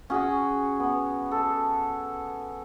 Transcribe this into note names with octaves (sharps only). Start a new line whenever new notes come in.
C#4 F#4 G#4
B3
A4